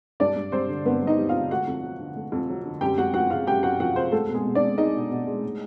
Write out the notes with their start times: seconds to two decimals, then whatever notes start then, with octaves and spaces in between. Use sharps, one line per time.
0.20 G2 D4 D5
0.36 G2
0.52 G3 C4 C5
0.69 D3
0.85 G2 B3 B4
1.02 G2
1.07 D#4 D#5
1.18 G3
1.29 D3 F4 F5
1.51 A3 F#4 F#5
1.67 F2
1.84 F#3
2.00 D3
2.16 A3
2.32 F2
2.49 F#3
2.65 D3
2.81 F#2 G4 G5
2.98 F#2 F#4 F#5
3.14 F3 F#4 F#5
3.30 C#3 F4 F5
3.47 F#2 G4 G5
3.63 F#2 F#4 F#5
3.80 F3 F#4 F#5
3.95 C#3 C4 C5
4.12 G#3 A3 A4
4.29 B2
4.34 G#3 G#4
4.45 B2
4.55 D4 D5
4.62 G#3
4.78 G#3 D#4 D#5
4.95 B2
5.10 B2
5.27 G#3
5.43 A2